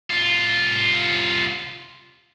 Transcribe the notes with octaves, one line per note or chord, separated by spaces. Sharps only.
C2 F4